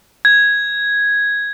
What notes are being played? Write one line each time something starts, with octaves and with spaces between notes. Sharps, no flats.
G#6